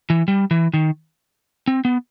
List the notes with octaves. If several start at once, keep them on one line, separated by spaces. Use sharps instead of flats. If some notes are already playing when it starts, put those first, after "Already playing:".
E3
G3
E3
D#3
C4
B3